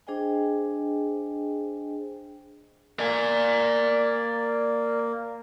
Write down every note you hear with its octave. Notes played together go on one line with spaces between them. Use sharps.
D4 G#4 C5 D#5 G5 G#5
A#3 D5 G#5